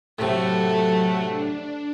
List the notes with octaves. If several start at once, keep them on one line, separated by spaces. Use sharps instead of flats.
A2 C3 F#3 A3 F#4
D4